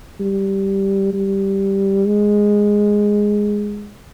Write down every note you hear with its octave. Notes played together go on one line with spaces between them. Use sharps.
G3
G3
G#3